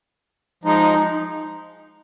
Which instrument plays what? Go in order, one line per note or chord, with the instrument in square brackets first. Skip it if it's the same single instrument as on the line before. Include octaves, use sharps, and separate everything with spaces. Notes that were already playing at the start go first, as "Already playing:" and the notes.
[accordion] F3 G#3 D#4